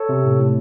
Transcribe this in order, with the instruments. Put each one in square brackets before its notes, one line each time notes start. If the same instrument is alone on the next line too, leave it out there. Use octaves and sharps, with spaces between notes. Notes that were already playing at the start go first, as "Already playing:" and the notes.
Already playing: [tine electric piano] A4 C#5
C3
A2
A2